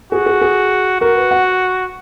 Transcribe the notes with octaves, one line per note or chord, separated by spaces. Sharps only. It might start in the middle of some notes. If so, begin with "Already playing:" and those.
F#4 G#4
G#4
G#4
F#4 A#4
B4
F#5